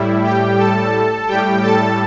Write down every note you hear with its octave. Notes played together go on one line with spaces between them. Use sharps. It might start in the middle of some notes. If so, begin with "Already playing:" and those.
Already playing: A2 G3 E4
G4 G5
A4 A5
A2 G3 G4 G5
A4 A5